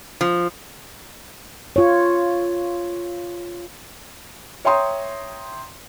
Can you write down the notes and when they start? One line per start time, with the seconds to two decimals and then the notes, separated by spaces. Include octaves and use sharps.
0.21 F3
1.76 F4 C#5
4.65 C#5 E5 G5 A#5 C6 D#6